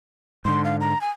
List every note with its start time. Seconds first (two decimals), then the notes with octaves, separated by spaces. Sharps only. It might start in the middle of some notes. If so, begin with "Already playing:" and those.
0.45 G#2 D3 C6
0.65 F5
0.81 A#5
1.01 G#5